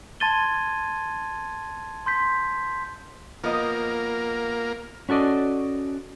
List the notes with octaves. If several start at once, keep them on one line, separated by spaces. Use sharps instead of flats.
A5 C6 G#6 A6 D#7 G7
C6 G6 B6
F3 A#3 B3 D#5
C#4 F#4 A4 D5 D#5